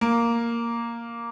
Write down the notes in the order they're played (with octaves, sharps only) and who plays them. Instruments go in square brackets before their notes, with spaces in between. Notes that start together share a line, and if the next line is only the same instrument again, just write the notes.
[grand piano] A#3